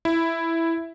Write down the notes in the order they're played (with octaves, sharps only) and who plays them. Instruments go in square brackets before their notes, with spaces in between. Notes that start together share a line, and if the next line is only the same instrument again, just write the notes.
[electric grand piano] E4